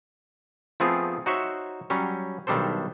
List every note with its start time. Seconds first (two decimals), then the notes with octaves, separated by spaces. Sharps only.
0.80 F3 A3 B3 C4 F4 G#4
1.26 D#4 F#4 C5 C#5 E5
1.90 F#3 G3 C#4 C#5
2.47 B1 D#3 G3 D4 A4 C5